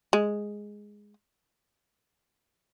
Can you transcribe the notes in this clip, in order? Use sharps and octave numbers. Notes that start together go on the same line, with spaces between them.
G#3